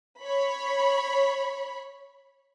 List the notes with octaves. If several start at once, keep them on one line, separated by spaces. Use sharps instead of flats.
C#5 B5